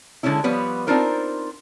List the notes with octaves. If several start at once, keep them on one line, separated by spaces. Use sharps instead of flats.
D3 G#3 A#3 C#4 E4
F3 G3 B3 B4 C#5
C4 D4 D#4 F4 A#4 C5